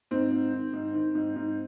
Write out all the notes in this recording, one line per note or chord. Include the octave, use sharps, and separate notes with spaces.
G#2 C4
G#2
D#3
G#2
D#3
G#2
G#2